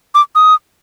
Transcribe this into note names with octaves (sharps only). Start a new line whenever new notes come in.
D6
D#6